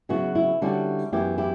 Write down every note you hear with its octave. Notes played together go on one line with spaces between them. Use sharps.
C#3 F#3 B3 E4 F#4
E4
D3 G3 C#4 E4 F#4
F#2 E3 B3 E4 G4
E4 G4